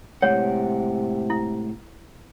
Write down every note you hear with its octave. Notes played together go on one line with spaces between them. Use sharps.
A2 C3 G#3 C#5 F#5
E4